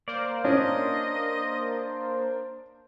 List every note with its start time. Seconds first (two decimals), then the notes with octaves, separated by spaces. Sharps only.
0.08 A#3 A#4 C5 D5
0.45 C#4 D4 D#5